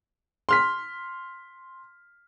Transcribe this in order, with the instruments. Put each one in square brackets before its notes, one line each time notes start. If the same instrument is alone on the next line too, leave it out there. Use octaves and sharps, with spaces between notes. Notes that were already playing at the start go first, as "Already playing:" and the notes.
[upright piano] C6 F6 B6